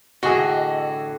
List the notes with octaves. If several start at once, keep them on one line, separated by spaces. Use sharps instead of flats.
A2 D3 E3 F#4 G#4 D#5